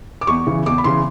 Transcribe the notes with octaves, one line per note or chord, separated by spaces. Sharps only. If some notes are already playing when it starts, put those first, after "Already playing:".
D6
E2 C#6
C#3 E3
E2 D6
B5
C#3 E3 C6